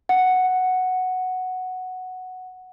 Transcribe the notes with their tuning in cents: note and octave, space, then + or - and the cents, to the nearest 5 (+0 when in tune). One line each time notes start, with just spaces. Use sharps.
F#5 +0